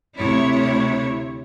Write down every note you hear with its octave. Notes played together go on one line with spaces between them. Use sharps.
D2 C3 E4 C#5